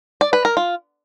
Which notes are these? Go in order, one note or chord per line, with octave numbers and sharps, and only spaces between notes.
D5
B4
A#4
F4